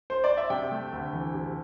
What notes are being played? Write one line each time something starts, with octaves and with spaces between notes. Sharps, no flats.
C5
D5
E5
C3 G5
A3
D2
E3
C3